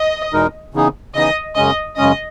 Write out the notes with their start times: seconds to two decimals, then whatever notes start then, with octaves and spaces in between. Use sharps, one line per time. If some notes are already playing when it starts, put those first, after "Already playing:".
Already playing: D#5
0.32 E2 B2 G#3 D#4 A#4
0.74 C#3 E3 B3 D#4 G#4
1.15 C#3 E3 B3 D#4 G#4 D#5
1.56 F#2 C#3 G#3 C#4 D#5
1.97 F#2 C#3 G#3 C#4 D#5